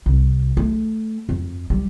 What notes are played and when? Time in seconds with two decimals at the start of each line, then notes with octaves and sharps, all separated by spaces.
0.06 C2
0.57 A3
1.29 F2
1.70 G3